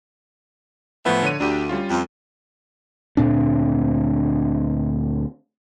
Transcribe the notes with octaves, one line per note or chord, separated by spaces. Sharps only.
A2 E3 F3 A3 B3 E5
D3 C#5 D#7
D2 D4 G4 G5
G3 C#4 F4
F2
D2 A#2 C4 D4